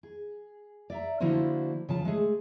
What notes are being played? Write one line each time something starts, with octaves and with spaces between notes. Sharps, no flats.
G#4
D5 E5 A#5
D3 F3 A#3 E4 F#4 C5
C#3 F3 A5
G#3 A3 G#4